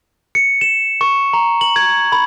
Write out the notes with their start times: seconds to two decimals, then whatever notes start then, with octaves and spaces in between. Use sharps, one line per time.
0.35 C#7
0.61 E7
1.01 C#6
1.33 A#5
1.61 F#7
1.76 G#6
2.12 B5